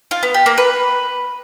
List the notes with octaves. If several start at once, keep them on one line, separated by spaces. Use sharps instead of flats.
F4
B3
G4
A#3
B4